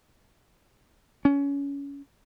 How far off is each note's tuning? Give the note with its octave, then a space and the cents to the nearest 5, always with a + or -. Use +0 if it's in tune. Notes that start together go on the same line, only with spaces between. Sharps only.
C#4 +25